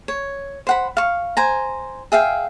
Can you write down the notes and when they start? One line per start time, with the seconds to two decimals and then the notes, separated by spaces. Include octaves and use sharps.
0.08 C#5
0.67 C5 F#5 B5
0.97 F5 C#6
1.37 C5 G#5 A#5
2.12 G#4 E5 F5 G5